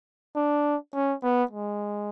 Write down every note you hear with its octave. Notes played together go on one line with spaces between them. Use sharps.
D4
C#4
B3
G#3